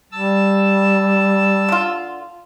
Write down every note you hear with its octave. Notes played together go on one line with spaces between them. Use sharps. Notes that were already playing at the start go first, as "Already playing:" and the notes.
G3 A5 E6
D3 F4